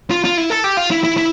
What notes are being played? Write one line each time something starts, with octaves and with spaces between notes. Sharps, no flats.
F4
F4
E4
A4
G4
F4
E4
E4
E4